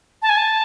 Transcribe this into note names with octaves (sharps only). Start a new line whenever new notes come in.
A5
G#5
A5